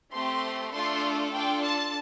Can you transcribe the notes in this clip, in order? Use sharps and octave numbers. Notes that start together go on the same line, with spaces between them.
A3 C4 G4 C6
A3 D4 F4 A4 C6
D4 F4 A4 G5
A5